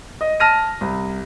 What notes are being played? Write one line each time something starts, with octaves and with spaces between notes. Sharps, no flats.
D#5
A5 F6 A#6 D#7
C2